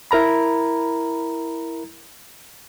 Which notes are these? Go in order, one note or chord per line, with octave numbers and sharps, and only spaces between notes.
E4 A#4 A#5 B5